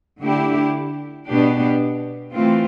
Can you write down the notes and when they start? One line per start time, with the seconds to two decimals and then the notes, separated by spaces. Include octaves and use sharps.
0.21 D3 A3 E4 G4
1.27 B2 B3 D4 G4
2.33 E3 A3 C4 F4